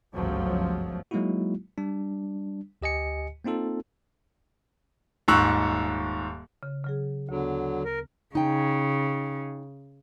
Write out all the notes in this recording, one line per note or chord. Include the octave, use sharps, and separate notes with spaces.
G1 C#2 F#2 F3 F#3 A3
F#3 G#3 A#3 D#4 E4 F#4
G3 D4
D2 G4 D#5 G#5 C#7
A#3 C4 D#4 F4 A4
D#1 G#2 C#6 E6 F#6
C#3
C#3 F#3 G#4
D2 D3 F#3 B3
A#4
C#3 D#4 G5